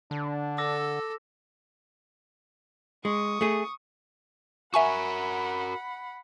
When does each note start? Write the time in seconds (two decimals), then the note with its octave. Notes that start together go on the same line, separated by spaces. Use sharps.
0.11 D3 D4
0.58 A4 D6 E6 A#6
3.05 G#3 C#6 D#6
3.41 A3 G#4
4.74 F#4 A#4 E5 F#5 G#5 B5 C#6